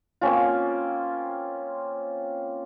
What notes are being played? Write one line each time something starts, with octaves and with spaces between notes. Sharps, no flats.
A#3 C4 C#4 F4